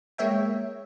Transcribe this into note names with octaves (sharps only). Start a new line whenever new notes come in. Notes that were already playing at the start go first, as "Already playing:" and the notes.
G#3 A#3 C#5 E5 G5